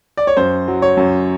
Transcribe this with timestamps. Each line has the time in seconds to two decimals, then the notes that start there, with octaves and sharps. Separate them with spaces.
0.17 D5
0.27 C#5
0.37 F#2 C5
0.68 F#3
0.82 C#5
0.97 F#2